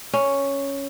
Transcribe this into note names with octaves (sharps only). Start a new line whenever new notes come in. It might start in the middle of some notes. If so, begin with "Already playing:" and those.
C#4